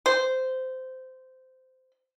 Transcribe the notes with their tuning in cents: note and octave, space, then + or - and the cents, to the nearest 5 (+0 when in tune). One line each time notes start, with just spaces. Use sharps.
C5 -15